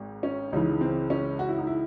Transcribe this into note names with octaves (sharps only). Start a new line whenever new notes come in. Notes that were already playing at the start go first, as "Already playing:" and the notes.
Already playing: G#1 G#2
C#4
C#2 C#3 E3 D#4
C4
C#4
F#4
E4
D#4
E4